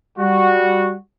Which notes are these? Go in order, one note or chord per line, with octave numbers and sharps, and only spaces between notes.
G3 F#4